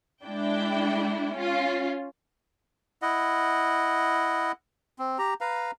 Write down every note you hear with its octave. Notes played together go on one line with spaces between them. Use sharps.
G#3 D4 E4 G5
C#4 F4
E4 D#5 F#5
C4
G4 A#5
B4 F5 A#5